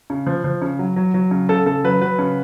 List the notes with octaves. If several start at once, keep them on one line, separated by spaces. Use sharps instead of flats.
C#3
F3
F3
C#3
F#3
F#3
F#3
C#3
C#3 A4
C#3 A4
F#3 B4
F#3 B4
C#3